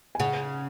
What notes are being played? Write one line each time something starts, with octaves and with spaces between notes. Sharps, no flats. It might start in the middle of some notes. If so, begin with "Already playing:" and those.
G#5
C#3 F#5